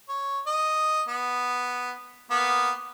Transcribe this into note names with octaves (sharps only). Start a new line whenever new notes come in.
C#5
D#5
B3
A#3 B3